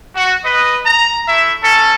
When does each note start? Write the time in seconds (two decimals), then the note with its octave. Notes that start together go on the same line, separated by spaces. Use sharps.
0.15 F#4
0.44 B4 D#5
0.85 A#5
1.28 A3 E4 E5
1.62 C#4 A4